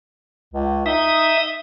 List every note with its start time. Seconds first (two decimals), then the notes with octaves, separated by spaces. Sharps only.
0.54 C#2
0.86 D#4 E5 D#6